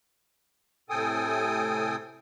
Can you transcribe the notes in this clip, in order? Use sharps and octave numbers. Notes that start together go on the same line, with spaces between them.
A2 C3 A4 G5 G#5 D#6